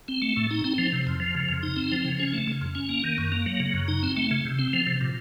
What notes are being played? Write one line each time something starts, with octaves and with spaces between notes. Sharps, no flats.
C4
A3
A2
D#4
C4
F3
C3
F2
F3
C#3
F2
D#4
C4
F3
C#3
C#4
A3
C#3
F2
C#4
A#3
D#3
F#2
A#3
F#3
C#3
F#2
D#4
C4
A3
C#3
C3
C4
F3
C3
A#2